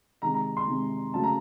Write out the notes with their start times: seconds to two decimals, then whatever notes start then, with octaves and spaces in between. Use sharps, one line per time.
0.22 C3 D#3 G#3 A#5
0.34 A#5
0.57 C6
0.67 C3 D#3 G#3
1.14 C#3 F#3 A3 A5
1.23 A#5